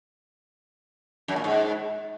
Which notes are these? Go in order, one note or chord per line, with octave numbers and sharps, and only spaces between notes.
F#2
A#2
G#2